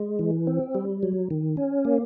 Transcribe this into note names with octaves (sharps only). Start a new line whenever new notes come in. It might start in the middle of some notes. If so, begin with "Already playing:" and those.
Already playing: G#3
E3
C4
G3
F#3
D#3
C#4
A#3